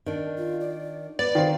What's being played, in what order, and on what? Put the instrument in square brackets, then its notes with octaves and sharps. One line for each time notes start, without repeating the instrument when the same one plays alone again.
[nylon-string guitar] D#3 D4
[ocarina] F4
D5
[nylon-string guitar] B3 [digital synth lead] D5
[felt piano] D#3 C5 [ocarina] F5